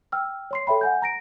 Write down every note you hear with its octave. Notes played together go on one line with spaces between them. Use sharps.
G5 E6 F6
C#5 C6 C7
A4 C#5 E5 G5 B5
F#5 G#5 G6
A#5 A#6 D7